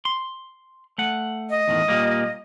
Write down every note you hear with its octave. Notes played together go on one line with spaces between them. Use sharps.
C6
A3 F#5
D#5
E2 A2 D#3
A#2 G3 A#3